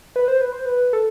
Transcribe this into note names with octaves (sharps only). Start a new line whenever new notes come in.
B4
C5
B4
C5
B4
A4